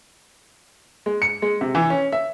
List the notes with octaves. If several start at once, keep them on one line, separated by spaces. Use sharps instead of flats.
G#3
C#7
G#3
C3
E3
C#4
E5